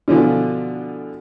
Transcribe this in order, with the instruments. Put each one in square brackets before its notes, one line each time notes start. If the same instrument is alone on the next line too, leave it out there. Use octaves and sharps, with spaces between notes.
[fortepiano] B2 D3 E3 F3